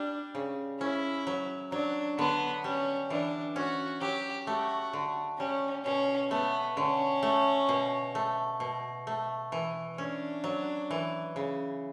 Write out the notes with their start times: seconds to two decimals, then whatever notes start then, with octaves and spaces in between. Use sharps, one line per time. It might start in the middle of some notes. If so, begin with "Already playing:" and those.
Already playing: G3 D4
0.35 C#3
0.81 C#4 E4
1.27 F#3
1.72 F#3 D4
2.18 D3 B3
2.64 G3 C#4
3.10 E3 D4
3.56 C#4 F#4
4.01 F#3 G4
4.47 A3 F#4
4.93 D3
5.39 G3 C#4
5.85 B2 C#4
6.31 A3 B3
6.77 D3 C#4
7.23 A3
7.69 B2
8.15 A3
8.60 B2
9.07 A3
9.52 E3
9.98 C#4 D4
10.44 F#3
10.91 E3
11.36 C#3